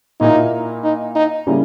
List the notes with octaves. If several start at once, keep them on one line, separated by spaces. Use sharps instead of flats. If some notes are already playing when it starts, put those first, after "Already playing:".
A#2 A#3 D#4 E4
D#4
D#4
C#3 G3 A#3 C#4 E4